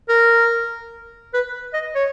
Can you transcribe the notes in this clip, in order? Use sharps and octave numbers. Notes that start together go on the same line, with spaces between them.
A#4
B4
D#5
C#5